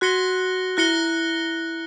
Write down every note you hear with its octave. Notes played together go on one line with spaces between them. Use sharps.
F#4 F#6 A#6 C#7 G7
E4 F#6 A#6 C#7 G7